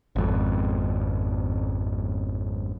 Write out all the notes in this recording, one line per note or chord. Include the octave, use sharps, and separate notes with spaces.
G#1 F2